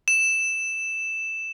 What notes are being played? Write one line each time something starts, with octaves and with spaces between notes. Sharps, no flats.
E7